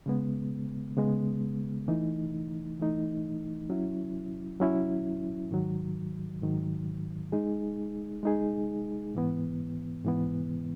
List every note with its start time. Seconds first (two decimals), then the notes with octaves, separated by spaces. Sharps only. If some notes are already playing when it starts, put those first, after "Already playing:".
0.06 C#3 G#3 B3
0.97 C#3 G#3 B3
1.88 E3 A3 D#4
2.79 E3 A3 D#4
3.70 F#3 C#4 E4
4.60 F#3 C#4 E4
5.51 G#2 D#3 F#3
6.42 G#2 D#3 F#3
7.32 G#3 D#4 G#4
8.23 G#3 D#4 G#4
9.15 G#2 E3 B3
10.05 G#2 E3 B3